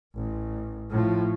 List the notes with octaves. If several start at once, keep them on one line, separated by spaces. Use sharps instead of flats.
A1
A2 F3